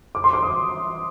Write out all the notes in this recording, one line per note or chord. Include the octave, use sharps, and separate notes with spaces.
D6
C6
D6
D#6